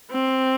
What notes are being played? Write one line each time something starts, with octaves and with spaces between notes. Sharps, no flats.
C4